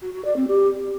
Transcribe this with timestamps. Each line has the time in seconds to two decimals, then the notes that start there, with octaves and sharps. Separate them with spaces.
0.02 F#4
0.13 F#4
0.25 D5
0.36 C4
0.47 G4